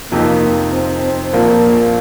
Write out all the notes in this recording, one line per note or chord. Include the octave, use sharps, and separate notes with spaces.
F2 C3 F3 A#3 D#4
C4
C4
A#1 A#2 F3 A#3